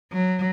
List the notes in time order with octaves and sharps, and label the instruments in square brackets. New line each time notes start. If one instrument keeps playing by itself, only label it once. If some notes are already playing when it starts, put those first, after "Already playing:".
[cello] F#3